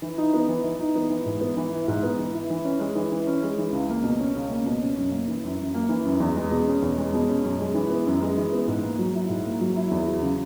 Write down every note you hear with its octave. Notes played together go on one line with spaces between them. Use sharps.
E3
D#4
B3
E3
E3
D#4
B3
E3
G#2
B3
E3
E4
G#2
B3
E3
E4
E3
C#4
G#3
E3
E3
C#4
G#3
E3
C#2
A#3
B2
C#4
C#2
A#3
B2
C#4
F#2
A#3
E3
F#2
F#2
A#3
E3
F#2
E2
G#3
B2
C#4
E2
G#3
B2
C#4
F#2
G#3
E3
B3
F#2
G#3
E3
B3
G#2
A#3
F#3
E4
G#2
A#3
F#3
E4
E2
F#3
C#3